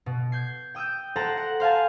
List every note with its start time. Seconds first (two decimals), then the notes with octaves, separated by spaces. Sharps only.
0.06 B2
0.32 G6 G#6 C7
0.75 G5 D#6 E6 G6
1.16 A4 C5 F#5 G5 A5 A#5
1.37 F#5
1.60 C5 F5 G#5 A5